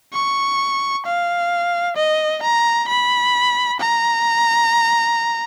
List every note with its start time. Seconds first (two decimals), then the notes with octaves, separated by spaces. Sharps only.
0.13 C#6
1.06 F5
1.97 D#5
2.43 A#5
2.89 B5
3.80 A#5